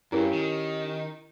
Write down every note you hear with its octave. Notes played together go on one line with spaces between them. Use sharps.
G2 C#4 E4 G4 G#4 A#4
D#3